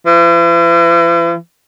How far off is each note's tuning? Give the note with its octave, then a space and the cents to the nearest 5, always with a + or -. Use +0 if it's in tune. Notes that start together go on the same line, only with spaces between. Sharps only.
E3 +45